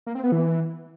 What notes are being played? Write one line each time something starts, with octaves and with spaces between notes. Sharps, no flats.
A#3
C4
B3
E3